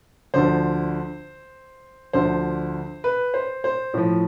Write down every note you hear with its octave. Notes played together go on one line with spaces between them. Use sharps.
D2 D3 F3 C5
D2 D3 F3 C5
B4
C5
C5
A2 F3